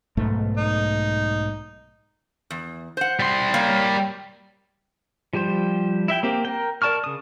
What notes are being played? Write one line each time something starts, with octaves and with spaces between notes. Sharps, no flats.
B1 G#2 A3
D#4
E2
C5 F#5
G3 C6
A#3 C#5
F3 G3 G4 C5
E4 E5 G5
A#3 C4 G4
A#4 G5
A#4 D5 A5 C#6 F6
C#3 D#6